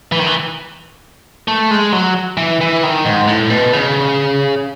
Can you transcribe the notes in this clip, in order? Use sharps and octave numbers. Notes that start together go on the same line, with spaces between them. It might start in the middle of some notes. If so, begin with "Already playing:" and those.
E3
D#3
E3
A3
G#3
F#3
E3
E3
D#3
G#2
A2
B2
C#3